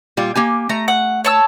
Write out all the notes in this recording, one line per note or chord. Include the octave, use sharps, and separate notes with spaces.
A#2 G3 F4
A#3 G4 G#5
A3 A#5
F#5
C#5 A5 E6